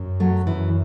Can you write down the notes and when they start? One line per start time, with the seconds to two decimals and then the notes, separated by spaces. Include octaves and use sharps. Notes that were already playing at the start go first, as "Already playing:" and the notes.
Already playing: F#2
0.20 F#3 A3
0.47 F#2 E3